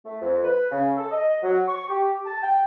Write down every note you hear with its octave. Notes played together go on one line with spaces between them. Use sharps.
A3
F2
B4
C#3
A4
D#5
F#3
C#6
G4
A5
G5